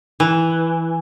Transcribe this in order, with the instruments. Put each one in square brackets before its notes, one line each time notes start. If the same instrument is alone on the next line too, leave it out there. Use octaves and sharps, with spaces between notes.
[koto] E3